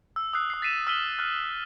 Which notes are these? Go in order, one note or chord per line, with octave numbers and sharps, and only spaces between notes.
E6
D#6 E6 F#6 C7
D#6 C7
A6 B6 C7 D#7 E7
E6 F6 B6 D#7 F#7 G7
F6 F#6